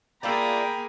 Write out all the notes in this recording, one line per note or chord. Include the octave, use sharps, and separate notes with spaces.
A#3 D4 F4 G#4 E5 G5 A#5 B5